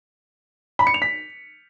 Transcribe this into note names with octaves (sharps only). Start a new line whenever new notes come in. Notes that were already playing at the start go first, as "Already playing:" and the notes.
B5
C#7
F7
B6